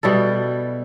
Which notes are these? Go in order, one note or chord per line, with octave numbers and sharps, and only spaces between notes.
B2 G3 E4 A4